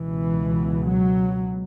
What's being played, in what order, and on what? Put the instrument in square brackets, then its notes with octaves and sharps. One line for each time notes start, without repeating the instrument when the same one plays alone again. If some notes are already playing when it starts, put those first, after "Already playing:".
Already playing: [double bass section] C#2 B2 E3
F#3